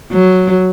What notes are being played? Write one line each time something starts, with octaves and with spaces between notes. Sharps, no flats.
F#3